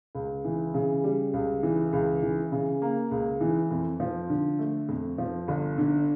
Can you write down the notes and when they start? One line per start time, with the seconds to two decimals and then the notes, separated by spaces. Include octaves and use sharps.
0.15 C#2
0.45 E3
0.74 C#3
1.04 G3
1.34 C#2
1.63 E3
1.93 C#2
2.23 E3
2.52 C#3
2.82 A#3
3.11 C#2
3.41 E3
3.71 F2
4.00 F3
4.30 D3
4.59 A3
4.89 F2
5.18 F3
5.48 G1
5.78 D3